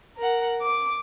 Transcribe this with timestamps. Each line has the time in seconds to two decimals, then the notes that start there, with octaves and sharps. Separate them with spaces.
0.17 A#4 F#5
0.61 D6